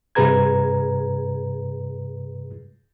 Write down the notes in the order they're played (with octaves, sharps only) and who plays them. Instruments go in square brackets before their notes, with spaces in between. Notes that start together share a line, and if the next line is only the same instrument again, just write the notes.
[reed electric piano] G2 C3 G#4 B4 A#5 G#6